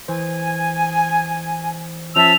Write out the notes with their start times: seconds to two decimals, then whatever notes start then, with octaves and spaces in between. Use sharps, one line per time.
0.08 E3 C5 G#5
2.16 F3 C#4 E5 A5 E6 F7